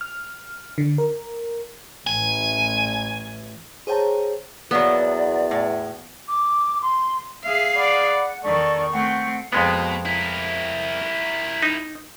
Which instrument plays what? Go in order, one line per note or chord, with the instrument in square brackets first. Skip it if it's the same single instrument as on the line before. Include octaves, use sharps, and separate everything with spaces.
[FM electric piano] F6
D3
A#4
[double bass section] A1 [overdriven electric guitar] G#5
[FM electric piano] G#4 C5 C#5 G5 A5 A#5
[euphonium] E2 [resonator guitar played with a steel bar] F#3 A#3 [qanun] B3 [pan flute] D5
[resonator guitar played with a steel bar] A2
[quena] D6
C6
[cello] G#4 F5 [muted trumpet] E5
[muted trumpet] D5 [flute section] F#5 [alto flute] B5
[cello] E2 D#3 [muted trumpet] A4 [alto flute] D5 [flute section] C#6
[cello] A3 C4 [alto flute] F#5 [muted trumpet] G5
[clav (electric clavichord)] F2 G#3 B3 [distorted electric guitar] B2
[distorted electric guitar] E4 A#4
[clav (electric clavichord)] D#4